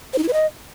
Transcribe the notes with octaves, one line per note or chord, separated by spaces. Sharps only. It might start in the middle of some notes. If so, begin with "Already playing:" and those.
C5
D#4
E4
B4
D#5